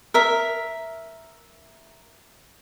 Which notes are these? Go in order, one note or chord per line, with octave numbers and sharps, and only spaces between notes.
A#4 E5